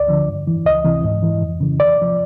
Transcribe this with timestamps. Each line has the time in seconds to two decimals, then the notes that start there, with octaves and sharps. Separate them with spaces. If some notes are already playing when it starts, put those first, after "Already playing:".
Already playing: D2 D5
0.08 D3 F3
0.28 G2
0.47 E3
0.65 C#2 D#5
0.84 C3 E3
1.03 G#2
1.23 E3
1.42 F2
1.61 C#3 E3
1.79 E2 D5
1.98 C3 F3